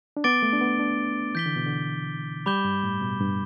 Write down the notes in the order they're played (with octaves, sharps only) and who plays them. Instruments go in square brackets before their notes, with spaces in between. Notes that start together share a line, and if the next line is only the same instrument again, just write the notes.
[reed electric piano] D4
[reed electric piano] B3 [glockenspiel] D6 A6 D7 G7
[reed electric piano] A3
D4
B3
D4
[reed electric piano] E3 [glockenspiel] G6 B6 G7
[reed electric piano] D3
B2
D3
[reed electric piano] G3 [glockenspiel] B5 D6 G6 E7 G7
[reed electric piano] G2
A2
B2
G2